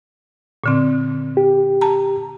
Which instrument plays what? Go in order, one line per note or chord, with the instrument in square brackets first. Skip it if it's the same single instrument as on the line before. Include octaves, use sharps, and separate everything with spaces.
[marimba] A#2 D3 C4
[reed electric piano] G4
[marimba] A5 A#5